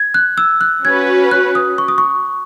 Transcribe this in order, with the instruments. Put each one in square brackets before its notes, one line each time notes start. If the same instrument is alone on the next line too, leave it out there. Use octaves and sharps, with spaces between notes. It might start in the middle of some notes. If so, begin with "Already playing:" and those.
Already playing: [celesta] G#6
F#6
E6
F#6
[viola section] C#4 F#4 B4 [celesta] G#6
[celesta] F#6
D#6
C#6
D#6
C#6